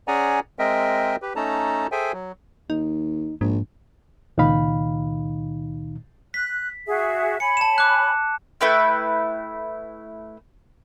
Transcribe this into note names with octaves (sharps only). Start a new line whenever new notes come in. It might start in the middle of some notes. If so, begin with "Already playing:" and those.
C#4 G#4 D5 F#5 G#5 A#5
G#3 C4 A#4 D#5 E5 G5
G4 B4
A3 C#4 D#4 A4 A5 A#5
G#4 A4 C5 E5 G5 G#5
F#3
D#2 D#4
A#1 G#2
C#2 A#2 D#3 D#4 F5 B5
F#6 B6
F#4 G#4 E5
C#5 G#5 B5 C#7
A5 E7
D6 F#6
A3 E4 B4 G5